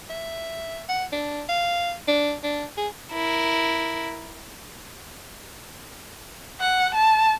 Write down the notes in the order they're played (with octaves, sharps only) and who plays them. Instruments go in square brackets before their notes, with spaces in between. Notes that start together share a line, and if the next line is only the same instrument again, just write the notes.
[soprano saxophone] E5
F#5
D4
F5
D4
D4
G#4
[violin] E4 A#4
[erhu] F#5
A5